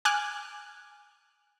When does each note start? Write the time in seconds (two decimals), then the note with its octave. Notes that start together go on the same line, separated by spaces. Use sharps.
0.05 G#5 D6 F6 F#6